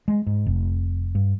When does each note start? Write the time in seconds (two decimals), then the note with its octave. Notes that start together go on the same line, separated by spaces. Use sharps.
0.08 G#3
0.26 G#2
0.46 F1
1.15 G2